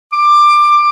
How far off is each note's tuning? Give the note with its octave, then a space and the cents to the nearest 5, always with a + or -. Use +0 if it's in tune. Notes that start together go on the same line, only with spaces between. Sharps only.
D6 +15